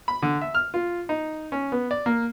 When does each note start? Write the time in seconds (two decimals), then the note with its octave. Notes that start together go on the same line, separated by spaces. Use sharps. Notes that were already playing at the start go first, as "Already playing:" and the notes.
0.08 B5
0.22 D3
0.41 E5
0.54 F6
0.74 F4
1.09 D#4
1.52 C#4
1.72 B3
1.91 D5
2.06 A#3